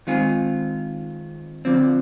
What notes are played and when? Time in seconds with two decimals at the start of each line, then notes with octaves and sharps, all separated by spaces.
0.07 D#3 G#3 C4 F4 G#4
1.65 D3 F3 C4